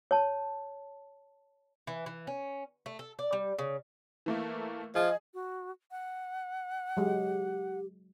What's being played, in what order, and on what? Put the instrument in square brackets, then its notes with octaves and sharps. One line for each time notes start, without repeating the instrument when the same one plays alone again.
[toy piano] C#5 A5
[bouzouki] E3
E3
C#4
A3
A4
D5
G3
C#3
[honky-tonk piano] E3 A3 A#3
[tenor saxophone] F3 [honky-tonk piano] G#4 [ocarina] D#5
[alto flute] F#4
F#5
[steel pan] F#3 G#3 [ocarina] G4